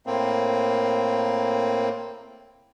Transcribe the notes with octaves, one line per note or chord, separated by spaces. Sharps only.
A2 A#3 C4